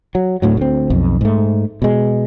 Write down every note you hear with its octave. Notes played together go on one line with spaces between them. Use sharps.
F#3
D1 D2 A2 F#3
D2 C4
B1 F2
G#2 A3
B2 G#3